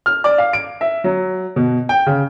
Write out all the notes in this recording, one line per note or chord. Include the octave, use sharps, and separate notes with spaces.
F6
D5
F5
D7
E5
F#3
B2
G5
C#3